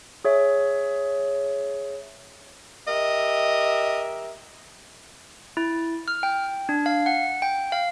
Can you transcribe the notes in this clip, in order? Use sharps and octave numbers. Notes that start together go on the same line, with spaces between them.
G#4 C#5 E5
G4 A#4 D#5 E5
E4
F6
G5
D4
F5
F#5
G5
F5